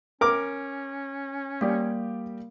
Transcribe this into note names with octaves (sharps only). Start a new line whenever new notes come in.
C#4 A#4 D6
G3 A#3 G4 D5